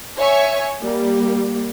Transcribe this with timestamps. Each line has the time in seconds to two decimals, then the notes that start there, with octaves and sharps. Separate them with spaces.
0.18 C#5 E5 G#5 C#6
0.81 G3 A#3